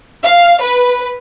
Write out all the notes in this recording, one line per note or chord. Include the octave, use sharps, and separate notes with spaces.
F5
B4